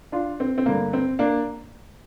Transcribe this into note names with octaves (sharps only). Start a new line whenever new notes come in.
D4 F4
C4
C4
G2 D3 A3 A#3
C4
A#3 D4